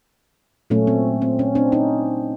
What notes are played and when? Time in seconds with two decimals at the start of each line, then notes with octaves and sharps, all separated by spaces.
0.70 A#2 F#3 A3 C#4
0.87 C4
1.22 C4
1.39 C#4
1.55 C4 D4
1.72 C#4 D#4